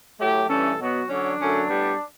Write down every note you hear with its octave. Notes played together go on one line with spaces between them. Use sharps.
A2 F#3 A3 G4
G2 E3 A3 C#4 A4
B2 F#3 B3 F#4
D3 F#3 C#4 D4
F#2 D3 F#3 A3 C#4
A2 G3 B3